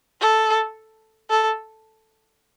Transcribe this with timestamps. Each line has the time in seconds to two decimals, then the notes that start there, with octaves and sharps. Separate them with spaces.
0.21 A4
1.30 A4